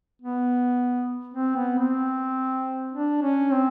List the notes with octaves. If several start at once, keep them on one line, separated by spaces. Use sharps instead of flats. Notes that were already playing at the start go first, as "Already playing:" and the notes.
B3
C4
B3
C4
D4
C#4
C4